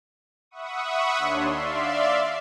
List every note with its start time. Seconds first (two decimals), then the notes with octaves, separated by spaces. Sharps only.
0.51 E5 F#5 B5 C#6 D#6
1.18 D#2 D4 C#5 C6
1.50 D5 E5 F5 C6